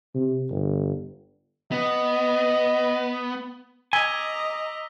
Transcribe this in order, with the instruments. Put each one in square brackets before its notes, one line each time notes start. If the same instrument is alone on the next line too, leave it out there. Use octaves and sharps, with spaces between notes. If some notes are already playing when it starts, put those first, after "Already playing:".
[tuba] C3
G1
[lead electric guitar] B3 [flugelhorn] D#5
[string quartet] D#5 A#5 D6 [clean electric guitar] G#5 [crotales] E6 B6 G7